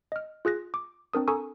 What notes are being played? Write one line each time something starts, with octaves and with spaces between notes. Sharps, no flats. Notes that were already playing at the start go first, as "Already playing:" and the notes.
D#5 F6
F4 G#4 F#6 A#6
D6
C4 D4 A#4 D#6
A4 G#5 A#5 C#6 D#6 E6